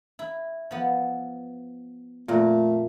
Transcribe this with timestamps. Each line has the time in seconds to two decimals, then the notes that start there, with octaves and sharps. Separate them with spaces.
0.19 E4
0.71 F3 B3
2.28 F2 A#2 A3 A#4